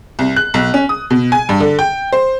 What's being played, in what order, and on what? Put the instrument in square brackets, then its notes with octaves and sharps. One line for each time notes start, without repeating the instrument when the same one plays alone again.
[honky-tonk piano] C2
F#6
B1
C#4
D#6
B2
G#5
G2
D3
G5
C5